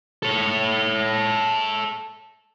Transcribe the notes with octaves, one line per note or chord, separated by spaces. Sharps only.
A4 C#5